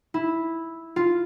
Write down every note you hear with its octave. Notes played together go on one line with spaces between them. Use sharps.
E4
F4